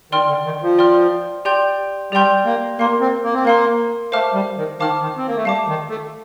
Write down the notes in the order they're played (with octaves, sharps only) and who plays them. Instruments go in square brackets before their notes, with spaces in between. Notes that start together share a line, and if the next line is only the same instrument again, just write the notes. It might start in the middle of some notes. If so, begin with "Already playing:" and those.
[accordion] D#3 [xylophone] D5 G5 C6 F6
[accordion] D3
D#3
F3
[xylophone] D5 G5 C6 F6
G4 D5 G5 C6 G6
[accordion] G3 [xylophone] G4 D5 G5 C6 G6
[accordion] A#3
[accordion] A#3 [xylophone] A#4 F5 C6
[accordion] C4
A#3
C4
[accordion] A#3 [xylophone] A#4 F5 C6
[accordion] A3 [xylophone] C5 F5 A5 D6 F6
[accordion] G3
D#3
[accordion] D#3 [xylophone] C5 F5 A5 D6 F6
[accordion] D#3
C4
A#3
A3
[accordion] G3 [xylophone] F5 A5 D6
[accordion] D#3
A3